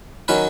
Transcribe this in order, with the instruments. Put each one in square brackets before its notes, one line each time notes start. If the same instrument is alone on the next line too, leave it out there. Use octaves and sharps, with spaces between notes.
[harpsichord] D#3 F#3 C#4 B4